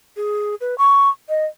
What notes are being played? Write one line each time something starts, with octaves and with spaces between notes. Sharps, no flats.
G#4
B4
C#6
D#5